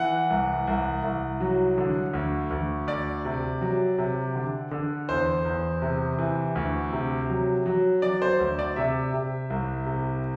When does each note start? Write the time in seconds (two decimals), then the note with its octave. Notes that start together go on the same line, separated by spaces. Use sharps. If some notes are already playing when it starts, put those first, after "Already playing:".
Already playing: E3 F#5
0.30 C2
0.67 C2
1.03 C2
1.40 F#3
1.78 D3
2.13 D2
2.50 D2
2.87 D2 D5
3.25 C3
3.61 F#3
3.98 C3
4.35 D3
4.71 D3
5.09 E2 C5
5.45 E2
5.82 C3
6.19 E3
6.55 D2
6.93 C3
7.30 F#3
7.66 F#3
8.02 F#3 D5
8.22 C5
8.40 D2
8.59 D5
8.76 C3 E5
9.14 C3
9.50 C2
9.86 C3